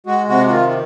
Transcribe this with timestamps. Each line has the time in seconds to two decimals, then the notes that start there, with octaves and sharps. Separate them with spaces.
0.06 G#3 F#4
0.28 C3 F#4
0.46 F#4
0.50 D#3 F4
0.69 F4